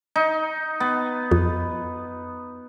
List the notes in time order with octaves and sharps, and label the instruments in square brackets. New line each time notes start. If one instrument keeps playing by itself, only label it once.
[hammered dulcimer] D#4
B3
[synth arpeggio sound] F2